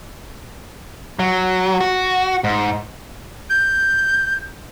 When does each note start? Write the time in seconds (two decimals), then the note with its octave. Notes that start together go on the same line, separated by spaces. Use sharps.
1.19 F#3
1.81 F#4
2.44 G#2
3.50 G6